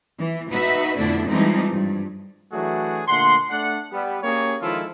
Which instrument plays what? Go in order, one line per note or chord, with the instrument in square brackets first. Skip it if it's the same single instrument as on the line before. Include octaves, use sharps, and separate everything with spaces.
[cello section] E3
D#4 F#4 B4 E5
F2 B2 D3 A3 D4 E4
E3 F3 G3 G#3 C4 D#4
G2
[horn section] E3 F#3 A3 D4 F#4 G#4
A#2 D3 A3 F#5 C6
A3 D4 D5 F#5
G3 B3
A#3 C#4 G4 G#4 C#5
D#3 F3 G#3 E4 F4 A4